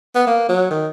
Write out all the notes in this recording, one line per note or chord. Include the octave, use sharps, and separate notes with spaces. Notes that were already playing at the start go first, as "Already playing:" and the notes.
B3
A#3
F#3
D#3